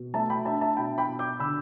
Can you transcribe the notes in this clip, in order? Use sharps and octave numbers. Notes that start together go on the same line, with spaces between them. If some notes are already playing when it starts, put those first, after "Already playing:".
Already playing: B2
A3 E5 A5
G5 B5
D4 E5 A5
E5 A5
B2 G5 B5
G5 B5
B2
D6 G6
D3 B5 E6